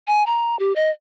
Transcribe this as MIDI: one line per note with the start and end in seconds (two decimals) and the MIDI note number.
0.08 0.23 80
0.26 0.58 82
0.59 0.73 67
0.76 0.90 75